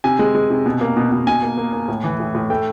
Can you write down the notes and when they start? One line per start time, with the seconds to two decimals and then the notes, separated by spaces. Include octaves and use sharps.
0.04 C3 G#5
0.19 G#3
0.35 G#3
0.50 C3
0.66 B2
0.81 A#3
0.97 B2
1.12 B2
1.27 B2 G#5
1.43 A#3
1.57 A#3
1.73 A#3
1.88 A2
2.04 E3
2.20 A2
2.35 A2
2.50 A3 G5